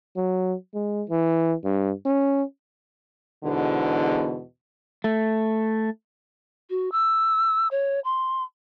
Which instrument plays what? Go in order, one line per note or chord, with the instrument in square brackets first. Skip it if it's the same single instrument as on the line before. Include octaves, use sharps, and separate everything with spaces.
[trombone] F#3
G#3
E3
G2
C#4
[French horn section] E2 G#2 B2 D3
[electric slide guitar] A3
[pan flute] F#4
E6
C#5
C6